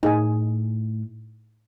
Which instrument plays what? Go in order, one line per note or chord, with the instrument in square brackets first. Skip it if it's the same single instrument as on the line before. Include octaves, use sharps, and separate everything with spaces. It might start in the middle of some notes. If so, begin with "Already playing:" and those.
[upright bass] A2 [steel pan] D#4 G#4 G#5